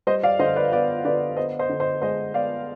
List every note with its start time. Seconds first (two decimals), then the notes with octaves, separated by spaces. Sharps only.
0.07 G3 C5 D#5
0.23 D5 F5
0.39 D3 C5 D#5
0.56 B4 D5
0.72 B3 B4 D5
1.04 D3 B4 D5
1.37 B3 C5 D#5
1.59 C5 D#5
1.69 D3
1.80 C5 D#5
2.02 G#3 C5 D#5
2.34 B3 D5 F5